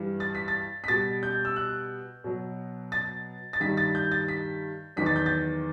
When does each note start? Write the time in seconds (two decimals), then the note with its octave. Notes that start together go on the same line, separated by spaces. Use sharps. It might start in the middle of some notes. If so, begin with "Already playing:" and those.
Already playing: G2 E3 G3
0.20 A6
0.35 B6
0.48 A6
0.84 B6
0.88 B2 G3 A6
1.23 G6
1.45 E6
1.56 F#6
2.24 B2 F#3
2.92 A6
3.53 A6
3.60 G2 D#3 G3 B6
3.77 A6
3.95 G6
4.12 A6
4.28 B6
4.96 E2 D#3 F#3 B6
5.06 A6
5.16 G6
5.26 A6